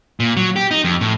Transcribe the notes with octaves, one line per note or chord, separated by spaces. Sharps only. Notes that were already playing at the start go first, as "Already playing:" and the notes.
A#2
F#3
G4
D#4
F2
A2